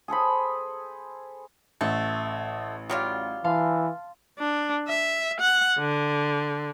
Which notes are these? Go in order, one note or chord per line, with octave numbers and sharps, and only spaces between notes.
G#4 A4 C5 B5
A1 A3 C#6
F#3 G3 F4 D5 F5
E3 F5 A5 C6
D4
E5
F#5
D3